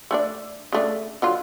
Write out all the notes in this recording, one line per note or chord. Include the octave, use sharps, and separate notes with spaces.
A3 D4 D5
C#3 A3 D4
D3 F#3 F4